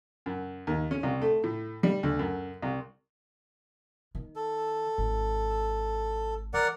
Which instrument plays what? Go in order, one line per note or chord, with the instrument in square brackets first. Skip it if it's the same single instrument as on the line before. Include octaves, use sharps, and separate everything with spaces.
[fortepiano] F#2
D#2
C#4
C2
A3
A2
G3
D2
F#2
C2
[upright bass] D#3
[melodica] A4
[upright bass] G#1
[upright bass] E3 [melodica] A#4 D5 F#5